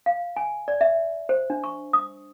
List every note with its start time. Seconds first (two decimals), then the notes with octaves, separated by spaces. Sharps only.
0.06 F5
0.37 G#5
0.68 D5
0.81 E5
1.29 C5
1.50 D4
1.64 C#6
1.93 D#6